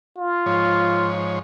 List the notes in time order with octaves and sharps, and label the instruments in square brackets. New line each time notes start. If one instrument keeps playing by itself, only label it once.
[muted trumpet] F4
[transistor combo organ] G#2 F3 C#5